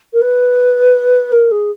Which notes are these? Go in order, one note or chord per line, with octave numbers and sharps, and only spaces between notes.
A#4
B4
A#4
G#4